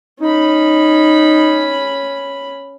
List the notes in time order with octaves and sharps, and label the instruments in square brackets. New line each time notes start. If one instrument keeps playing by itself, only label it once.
[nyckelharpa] C#4 B5 [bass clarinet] D#4